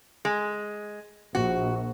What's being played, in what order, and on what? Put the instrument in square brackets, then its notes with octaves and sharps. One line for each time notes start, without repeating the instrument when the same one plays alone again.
[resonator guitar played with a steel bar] G#3
[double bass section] A#1 [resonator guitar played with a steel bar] F#4